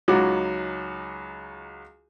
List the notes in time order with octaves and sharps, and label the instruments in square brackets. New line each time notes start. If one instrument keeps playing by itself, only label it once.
[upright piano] C#2 F#3 D#4 F4 F#4 D6